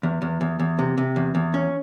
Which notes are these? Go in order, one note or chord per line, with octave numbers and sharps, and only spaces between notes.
E2
E2
E2
E2
C3
C3
E2
E2
C#4